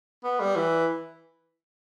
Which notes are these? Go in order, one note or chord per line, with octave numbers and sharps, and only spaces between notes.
B3
G3
E3